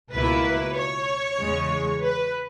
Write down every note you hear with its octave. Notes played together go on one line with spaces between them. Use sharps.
C#2 B2 A#3 E4 B4
C#5
E2 C#3 G#3
B4